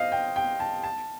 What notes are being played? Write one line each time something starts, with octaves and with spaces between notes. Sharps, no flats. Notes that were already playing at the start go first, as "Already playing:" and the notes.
Already playing: C5 D#5 F5
G5
G5
A5
A5